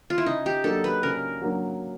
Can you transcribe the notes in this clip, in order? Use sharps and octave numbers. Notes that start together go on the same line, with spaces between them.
F4
E4
C#3 D#4
G4
F#3 A#3 D4 A4
B4
C#3 A#4
F#3 A#3 D4